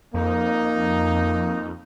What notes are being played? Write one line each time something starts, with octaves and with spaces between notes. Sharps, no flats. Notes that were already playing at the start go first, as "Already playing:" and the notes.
F2 A#3 D#4